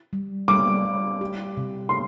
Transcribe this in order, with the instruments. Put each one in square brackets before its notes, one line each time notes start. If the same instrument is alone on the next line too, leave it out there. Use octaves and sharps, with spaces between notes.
[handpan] G3
[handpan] G3 [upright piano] D6
[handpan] G3
G4
C3
[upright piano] C6